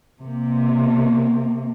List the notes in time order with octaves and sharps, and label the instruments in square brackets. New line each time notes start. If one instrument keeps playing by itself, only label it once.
[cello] C3 A#3